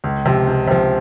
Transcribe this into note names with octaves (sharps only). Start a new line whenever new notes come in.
C#2
C3 F3
C#2
C3 F3